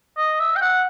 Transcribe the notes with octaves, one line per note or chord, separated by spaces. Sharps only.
D#5
E5
G5
F#5